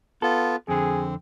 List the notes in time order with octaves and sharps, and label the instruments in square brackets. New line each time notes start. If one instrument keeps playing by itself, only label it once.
[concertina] B3 F4 [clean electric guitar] A4
[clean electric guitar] F2 D3 [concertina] C4 [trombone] G#4